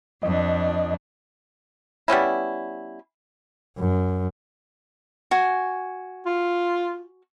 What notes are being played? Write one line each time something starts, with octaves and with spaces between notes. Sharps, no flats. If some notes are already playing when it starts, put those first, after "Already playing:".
F2 D4 D#5
G3 B3 C#4 E4
F#2
F#4 G#5
F4